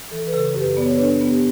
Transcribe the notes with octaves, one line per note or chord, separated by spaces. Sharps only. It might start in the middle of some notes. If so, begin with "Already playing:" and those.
E3 A4
B4
C#3 A4
F#2 G4 B4
B3 D5
C#5
B4
D4 A4 C#5
B3
G4